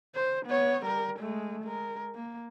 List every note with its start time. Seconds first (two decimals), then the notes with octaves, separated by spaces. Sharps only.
0.15 C5
0.46 B3 C#5
0.85 G3 A#4
1.19 G#3 A3
1.64 G#3 A#4
2.15 A#3